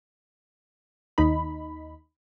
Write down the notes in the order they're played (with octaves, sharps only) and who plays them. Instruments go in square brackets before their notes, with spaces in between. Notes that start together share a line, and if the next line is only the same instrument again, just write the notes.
[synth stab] D#2 D#4 B5